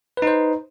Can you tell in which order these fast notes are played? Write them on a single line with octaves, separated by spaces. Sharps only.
B4 D#4 C5